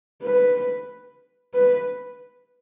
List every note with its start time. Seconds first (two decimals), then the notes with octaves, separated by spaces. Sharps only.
0.23 B4
1.54 B4